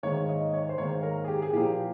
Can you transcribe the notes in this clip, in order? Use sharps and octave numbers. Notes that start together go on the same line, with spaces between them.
G#2 D#3 A#3 C#5
D#5
C#5
C5
G#2 D#3 A#3 C#5
A#4
G#4
G4
G#4
A#2 F3 A#3 G4